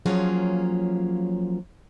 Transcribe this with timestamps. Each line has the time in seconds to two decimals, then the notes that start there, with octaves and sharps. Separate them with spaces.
0.06 F3 F#3 A#3 C#4 F4 G#4